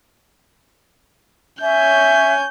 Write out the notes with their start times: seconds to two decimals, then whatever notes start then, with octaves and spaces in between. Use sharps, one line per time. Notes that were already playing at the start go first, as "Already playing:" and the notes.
1.61 C#4 C#5 E5 G#5 G6